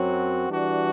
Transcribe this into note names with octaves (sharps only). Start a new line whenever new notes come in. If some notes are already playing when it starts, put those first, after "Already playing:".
Already playing: F#2 F#3 C4 F#4
E3 G3 D4 F#4